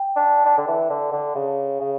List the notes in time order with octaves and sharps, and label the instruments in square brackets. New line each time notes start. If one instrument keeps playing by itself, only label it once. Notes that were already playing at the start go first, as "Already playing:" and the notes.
Already playing: [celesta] G5
[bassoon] D4
D4
D3
E3
D3
D3
C#3
C#3